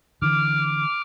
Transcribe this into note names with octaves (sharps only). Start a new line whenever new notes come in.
D3 E3 D6 F6